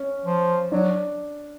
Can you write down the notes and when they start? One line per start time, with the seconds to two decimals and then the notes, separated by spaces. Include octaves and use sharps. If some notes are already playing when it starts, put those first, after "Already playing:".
Already playing: C#4
0.24 F3
0.72 F#3 D4